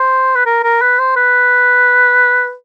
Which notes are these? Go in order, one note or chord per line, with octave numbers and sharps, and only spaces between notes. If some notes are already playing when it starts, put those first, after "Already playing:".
Already playing: C5
B4
A#4
A#4
B4
C5
B4